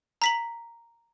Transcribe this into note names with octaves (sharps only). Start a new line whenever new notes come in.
A#5 B6 F#7